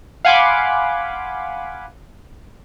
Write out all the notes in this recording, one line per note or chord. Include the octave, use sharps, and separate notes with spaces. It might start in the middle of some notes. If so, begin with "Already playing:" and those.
F5 F#5 G#5 B5 C6 D6